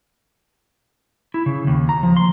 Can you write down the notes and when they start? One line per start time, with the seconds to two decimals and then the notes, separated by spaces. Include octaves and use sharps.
1.34 E4
1.46 C#3
1.67 D#2
1.89 A#5
2.03 F3
2.17 C6